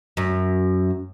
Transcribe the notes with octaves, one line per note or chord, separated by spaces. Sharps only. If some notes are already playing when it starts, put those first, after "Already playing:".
F#2